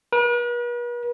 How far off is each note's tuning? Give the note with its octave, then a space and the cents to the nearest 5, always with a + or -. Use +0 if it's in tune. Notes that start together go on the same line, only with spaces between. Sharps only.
B4 -45